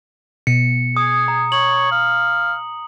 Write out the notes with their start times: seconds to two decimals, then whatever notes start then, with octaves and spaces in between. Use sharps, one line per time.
0.47 B2 C#7
0.97 G#4 D#6
1.28 A#5
1.52 C#5 F#7
1.91 F5